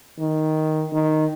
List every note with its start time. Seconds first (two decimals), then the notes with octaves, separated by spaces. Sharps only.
0.20 D#3
0.93 D#3